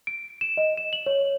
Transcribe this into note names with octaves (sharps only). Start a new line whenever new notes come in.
D7
E7
D#5
E7
F#7
C#5